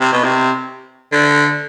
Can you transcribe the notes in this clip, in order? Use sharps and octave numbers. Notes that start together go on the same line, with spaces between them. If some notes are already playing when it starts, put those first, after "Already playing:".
C3
B2
C3
D3